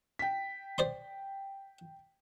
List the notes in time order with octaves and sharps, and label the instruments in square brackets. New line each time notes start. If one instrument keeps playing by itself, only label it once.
[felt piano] G5 B6
[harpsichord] C5 D5 C6